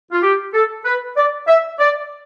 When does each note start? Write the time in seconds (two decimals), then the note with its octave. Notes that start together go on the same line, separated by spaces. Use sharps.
0.12 F4
0.22 G4
0.54 A4
0.85 B4
1.16 D5
1.48 E5
1.79 D5